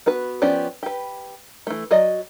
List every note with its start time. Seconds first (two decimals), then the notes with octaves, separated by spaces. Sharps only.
0.06 B3 F#4 B4
0.42 F3 B3 C#4 G4 D5
0.83 G4 B4
1.67 E3 A3
1.91 F#3 D5 D#5